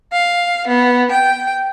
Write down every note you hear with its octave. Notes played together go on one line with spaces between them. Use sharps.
F5
B3
G5